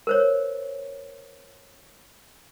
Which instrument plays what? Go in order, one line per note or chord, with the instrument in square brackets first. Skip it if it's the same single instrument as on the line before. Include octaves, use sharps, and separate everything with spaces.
[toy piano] A#4 C5 C#5